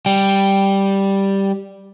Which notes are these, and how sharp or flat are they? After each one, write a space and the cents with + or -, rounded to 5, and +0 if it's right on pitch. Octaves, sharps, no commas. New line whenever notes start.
G3 +0 G5 +0